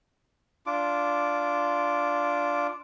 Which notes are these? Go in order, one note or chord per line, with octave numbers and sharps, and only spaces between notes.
D4 F4 D6